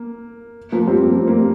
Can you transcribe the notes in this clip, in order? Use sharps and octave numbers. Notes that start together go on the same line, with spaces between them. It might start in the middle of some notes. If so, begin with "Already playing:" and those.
Already playing: A#3
F3 A#3
G3 C4
F3 A#3
C4
A#3
G3